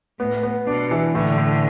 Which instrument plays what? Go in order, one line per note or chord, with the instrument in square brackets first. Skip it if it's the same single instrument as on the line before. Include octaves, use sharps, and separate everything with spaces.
[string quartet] A2 [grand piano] B3
[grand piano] B3
[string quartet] B2 [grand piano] D4
[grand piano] E3
[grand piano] A2 [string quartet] D3
[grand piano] A2